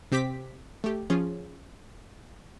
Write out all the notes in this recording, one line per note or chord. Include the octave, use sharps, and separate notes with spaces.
C3 C4 G4 G5 D6 B6
A3 G4
F3 C#4 F4 G#4